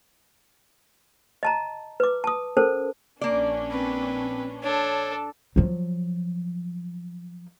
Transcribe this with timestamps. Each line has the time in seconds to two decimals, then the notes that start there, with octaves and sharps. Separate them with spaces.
1.43 D#5 A5 A#5
2.00 B4 D6
2.24 A5 D#6
2.57 C#4 A4 A#4 C5 A5
3.21 A#1 A#3 C#4 D4 D5
3.71 C4 B4
4.63 D4 A4 C#5
5.56 F3 F#3